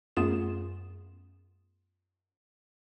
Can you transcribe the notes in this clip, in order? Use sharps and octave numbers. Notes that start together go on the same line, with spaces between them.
F#2 A3 B3 F4 G#4 E7